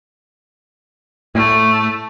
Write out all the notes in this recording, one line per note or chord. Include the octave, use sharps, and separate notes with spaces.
A2 A3